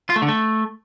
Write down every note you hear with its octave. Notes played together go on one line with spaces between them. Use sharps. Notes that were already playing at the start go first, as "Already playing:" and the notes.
F4
A3
D3
A3